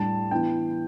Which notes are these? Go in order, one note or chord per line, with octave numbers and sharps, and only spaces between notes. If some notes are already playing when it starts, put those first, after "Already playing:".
Already playing: A2 G3 D4 A5
E3 B3 D4 G5